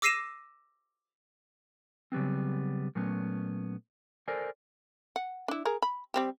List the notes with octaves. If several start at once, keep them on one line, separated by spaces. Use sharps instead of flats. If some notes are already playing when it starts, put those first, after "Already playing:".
D6 E6 A#6 C7 D#7 E7
C#3 F#3 G3 B3 C4
A#2 F#3 A3 B3 C#4
A4 A#4 C5 D5 G#5
F#5
D4 E4
G#4 A#4
B5
G3 C4 G4